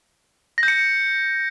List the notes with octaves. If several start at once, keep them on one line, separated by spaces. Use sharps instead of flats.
A#6
G6
C#7